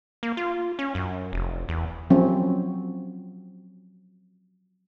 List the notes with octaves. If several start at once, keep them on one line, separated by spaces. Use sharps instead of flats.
A#3
F4
C#4
F#2
F1
E2
F3 F#3 C4 C#4